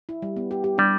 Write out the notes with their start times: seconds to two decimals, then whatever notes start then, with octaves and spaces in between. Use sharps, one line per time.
0.09 E4
0.22 G3
0.36 B3
0.51 G4
0.64 G4
0.78 G3 D4